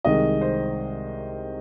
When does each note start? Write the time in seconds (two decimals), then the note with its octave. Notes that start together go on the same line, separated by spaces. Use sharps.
0.05 C2 C3 D#3 G#3 D#5
0.41 C5